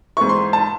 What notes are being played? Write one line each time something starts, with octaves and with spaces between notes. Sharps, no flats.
G#2 E3 C#6
C6
A5